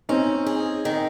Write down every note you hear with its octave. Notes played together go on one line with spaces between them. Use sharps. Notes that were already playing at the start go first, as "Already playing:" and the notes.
C4 C#4 D#4
G#4
D#3